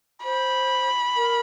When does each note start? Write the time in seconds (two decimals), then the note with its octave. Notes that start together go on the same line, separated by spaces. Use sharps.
0.23 C5 B5
1.17 A#4